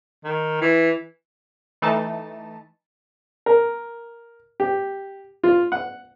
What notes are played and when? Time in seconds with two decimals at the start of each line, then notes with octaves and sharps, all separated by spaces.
0.24 D#3
0.62 E3
1.82 E3 A3 D#4 A5
3.46 A#4
4.60 G4
5.44 F4
5.72 F#5